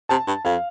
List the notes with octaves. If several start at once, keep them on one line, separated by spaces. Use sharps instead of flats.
C3 A5
G2
F2 F5